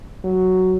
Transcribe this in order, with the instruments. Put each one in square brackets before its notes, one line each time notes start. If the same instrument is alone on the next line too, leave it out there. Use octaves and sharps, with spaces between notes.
[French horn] F#3